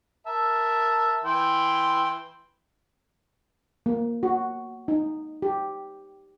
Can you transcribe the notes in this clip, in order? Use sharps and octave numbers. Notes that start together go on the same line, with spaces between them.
A#4 E5 A5
E3 G5 C6
A#3
F#4
D#4
G4